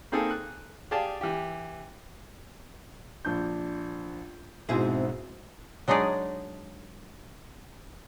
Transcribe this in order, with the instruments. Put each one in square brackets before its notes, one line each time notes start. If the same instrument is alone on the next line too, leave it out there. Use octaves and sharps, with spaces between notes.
[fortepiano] A#3 C4 D#4 G#4 A4
F#6
G4 G#4 D5 F5 G5 A5
E3 G4
[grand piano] A#1 D4 G6
[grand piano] G#2 B2 [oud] C4 E4 G#4
[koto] F#3 G#3 D4 D#4 G#4 D5